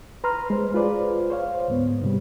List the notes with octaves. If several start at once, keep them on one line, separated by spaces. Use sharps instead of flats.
B4 A#5 C6 F6
G#3 C5
F4 G#4 B4 C5 D5
C5 C#5 F5
D2 G#2 B3
G#2 C3 G3